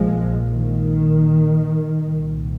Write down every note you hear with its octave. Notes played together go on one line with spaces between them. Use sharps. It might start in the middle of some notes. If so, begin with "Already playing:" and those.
Already playing: A#1 A#2 F3 G#3
D#3
C2 A#2